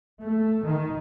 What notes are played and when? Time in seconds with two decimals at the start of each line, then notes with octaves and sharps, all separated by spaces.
0.22 A3
0.64 D#3